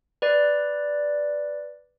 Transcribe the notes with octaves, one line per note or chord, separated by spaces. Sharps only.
B4 D5